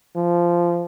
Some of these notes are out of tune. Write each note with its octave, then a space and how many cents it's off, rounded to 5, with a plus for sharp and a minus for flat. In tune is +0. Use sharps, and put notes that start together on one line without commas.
F3 -15